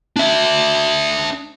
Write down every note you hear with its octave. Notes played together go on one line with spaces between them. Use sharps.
D4 E5